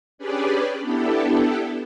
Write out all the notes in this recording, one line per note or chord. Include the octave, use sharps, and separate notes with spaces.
C#4 D4 G4 G#4 B4 D5
B3 D4 E4 G4 A4